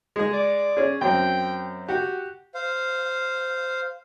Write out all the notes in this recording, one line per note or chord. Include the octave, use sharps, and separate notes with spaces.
G#3 G#4
D5
C#4 G#4
F#2 C4 G5
F#4 G4
C5 F5